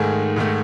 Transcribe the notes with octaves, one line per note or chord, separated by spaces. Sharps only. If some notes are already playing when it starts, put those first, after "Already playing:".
Already playing: G#2 D#3 A3 G#4
G#2 D#3 A3